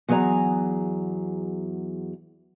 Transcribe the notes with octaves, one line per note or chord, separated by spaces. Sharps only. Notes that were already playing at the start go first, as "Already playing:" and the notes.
E2 F#3 G#4 E5 A#5